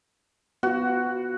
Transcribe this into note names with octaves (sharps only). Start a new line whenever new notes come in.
B3 F4 F#4